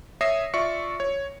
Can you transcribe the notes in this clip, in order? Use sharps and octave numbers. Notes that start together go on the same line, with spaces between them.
C#5 E5 D#6 A#6 C7
F4 D5 E5 C#6 C#7
C#5